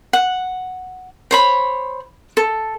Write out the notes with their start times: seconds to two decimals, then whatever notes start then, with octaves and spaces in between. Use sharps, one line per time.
0.13 F#5
1.31 C5 C#5 B5
2.37 A4